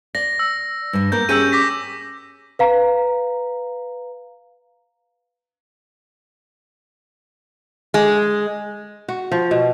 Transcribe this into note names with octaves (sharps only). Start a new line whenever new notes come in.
D5 A#6
E6
G2 G3
A#3 B3 A#4 G6
C#4 G4 G#4 E6 G6 D#7
D6 A#6 B6
B4 F5 A#5
G#3
F#4
F3
B2